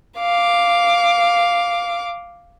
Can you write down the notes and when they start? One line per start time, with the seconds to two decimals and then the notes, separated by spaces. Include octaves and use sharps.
0.18 F5 D6